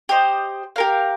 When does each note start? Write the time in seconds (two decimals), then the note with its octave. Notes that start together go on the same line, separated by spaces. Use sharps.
0.09 G4 C5 D#5
0.76 G4 A#4 F5